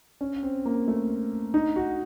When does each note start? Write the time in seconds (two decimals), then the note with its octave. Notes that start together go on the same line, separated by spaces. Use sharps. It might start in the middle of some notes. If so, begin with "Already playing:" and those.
0.21 C#4
0.43 C4
0.66 A#3
0.88 A3
1.54 D#4
1.76 F#4